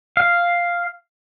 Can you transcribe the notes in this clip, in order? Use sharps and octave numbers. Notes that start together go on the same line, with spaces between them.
F5